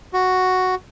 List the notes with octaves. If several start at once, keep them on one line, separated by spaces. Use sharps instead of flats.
F#4